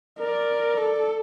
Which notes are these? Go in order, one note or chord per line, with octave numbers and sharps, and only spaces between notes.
A#4 D5
A4 D5